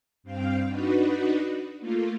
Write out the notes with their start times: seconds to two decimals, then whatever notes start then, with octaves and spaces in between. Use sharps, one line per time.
0.23 G2 C4 F5 G5
0.66 D4 D#4 F#4 B4
1.80 A3 A#3 F4